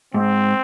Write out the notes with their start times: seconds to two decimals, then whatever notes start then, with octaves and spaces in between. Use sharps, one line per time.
0.14 G#2 C4